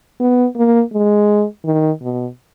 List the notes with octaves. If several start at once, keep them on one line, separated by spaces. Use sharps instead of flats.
B3
A#3
G#3
D#3
B2